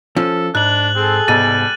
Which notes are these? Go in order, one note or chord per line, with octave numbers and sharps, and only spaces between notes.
F3 C#4 A4
G#2 D4 F#6 F#7
C4 G#4 A4
C2 G#2 B2 G3 A6 D#7